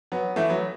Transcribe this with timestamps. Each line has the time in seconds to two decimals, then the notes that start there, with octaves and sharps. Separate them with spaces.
0.12 F#3 B3
0.36 E3 A3
0.49 F#3 B3